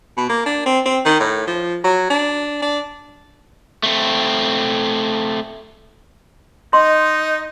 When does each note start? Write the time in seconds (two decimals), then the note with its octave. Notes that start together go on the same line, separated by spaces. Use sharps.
0.17 B2
0.30 A#3
0.46 D4
0.66 C4
0.86 C4
1.05 D#3
1.20 A2
1.47 F3
1.84 F#3
2.10 D4
2.62 D4
3.83 A3 C4
6.73 D#4 D#5 C6